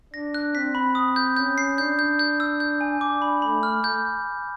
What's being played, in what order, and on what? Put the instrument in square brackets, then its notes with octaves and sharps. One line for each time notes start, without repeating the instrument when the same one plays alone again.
[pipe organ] D4 [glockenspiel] A#6
[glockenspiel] F#6
[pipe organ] C4 [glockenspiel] B6
[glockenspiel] B5
D#6
G6
[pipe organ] C#4 [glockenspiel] G6
[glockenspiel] C7
[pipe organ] D4 [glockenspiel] G6
[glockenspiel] G6
G6
E6
G6
G#5
[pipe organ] D4 [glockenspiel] D6
[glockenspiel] B5
[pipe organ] A3 [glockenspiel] B5
[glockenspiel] F6
G6